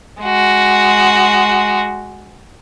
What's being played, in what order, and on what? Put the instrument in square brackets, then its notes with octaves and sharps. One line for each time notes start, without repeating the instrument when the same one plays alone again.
[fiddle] G#3 F#4